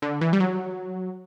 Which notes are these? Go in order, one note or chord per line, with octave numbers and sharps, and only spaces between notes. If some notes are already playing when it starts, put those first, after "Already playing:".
D3
E3
G3
F#3